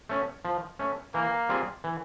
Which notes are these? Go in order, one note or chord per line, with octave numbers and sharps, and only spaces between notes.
A3 C#4
F3
A3 C#4
E3 A#3
G3 C4 F4 G#4
E3